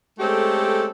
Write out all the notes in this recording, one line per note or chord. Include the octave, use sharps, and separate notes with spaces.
G#3 A3 C4 C#4 G4 A4